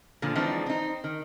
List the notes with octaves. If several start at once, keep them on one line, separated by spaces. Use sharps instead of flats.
A#2 D3 F3
E3 F3 G#3 C4 D4 D#4
C4 D#4
D#3